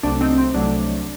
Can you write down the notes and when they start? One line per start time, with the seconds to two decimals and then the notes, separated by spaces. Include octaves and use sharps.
0.03 C2 C3 F#3 A3 D4
0.21 C4 D#4
0.38 C4
0.54 C2 C3 F#3 A3 D4